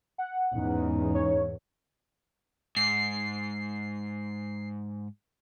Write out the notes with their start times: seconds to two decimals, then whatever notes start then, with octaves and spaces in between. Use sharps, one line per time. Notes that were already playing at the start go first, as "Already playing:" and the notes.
0.18 F#5
0.54 E2 G#2 C#4 D#4
1.14 C#5
2.76 G#2 C7